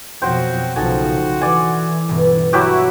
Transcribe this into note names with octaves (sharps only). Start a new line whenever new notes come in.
F2 B2 F3 F#3 C4 F#4 C5 G5
B1 C#3 F3 D#4 F#4 A4 G#5
E3 C5 D5 G#5
G1 B2
F#3 E4 F#4 G4